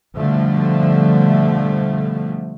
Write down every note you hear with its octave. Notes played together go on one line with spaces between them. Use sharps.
B2 D3 F3 G3 A3